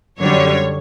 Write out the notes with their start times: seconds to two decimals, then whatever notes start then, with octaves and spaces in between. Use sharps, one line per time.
0.18 F#2 D3 G3 C#5